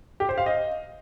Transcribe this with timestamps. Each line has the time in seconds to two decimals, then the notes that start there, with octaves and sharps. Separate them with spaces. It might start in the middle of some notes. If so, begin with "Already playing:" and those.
0.20 G4
0.29 C5
0.38 F5
0.46 D#5